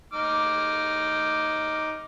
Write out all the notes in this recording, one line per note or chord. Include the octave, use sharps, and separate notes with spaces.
D#4 D6 F6